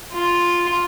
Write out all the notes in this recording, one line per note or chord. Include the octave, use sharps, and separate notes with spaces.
F4